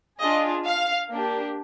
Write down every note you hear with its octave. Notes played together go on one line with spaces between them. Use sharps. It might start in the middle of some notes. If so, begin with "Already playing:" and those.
D4 F4 G#4 D#5
F5
A#3 D4 G4